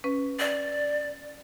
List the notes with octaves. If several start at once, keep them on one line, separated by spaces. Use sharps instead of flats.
C#4 B4
D5